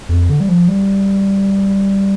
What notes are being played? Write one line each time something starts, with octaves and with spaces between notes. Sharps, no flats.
F2
D3
G3
F3
G3